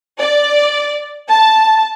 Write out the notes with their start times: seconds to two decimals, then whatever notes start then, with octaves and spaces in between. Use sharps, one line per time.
0.19 D5
1.29 A5